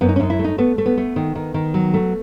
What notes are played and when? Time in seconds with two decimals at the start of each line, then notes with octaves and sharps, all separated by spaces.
0.01 F#2 B3
0.09 D#4
0.16 C#4
0.20 F#2 D#4
0.30 E4
0.39 A3
0.44 D#4
0.58 A3 B3
0.78 A3
0.86 B3
0.97 A3
1.16 D#3
1.35 D#3
1.54 D#3
1.74 F#3
1.94 A3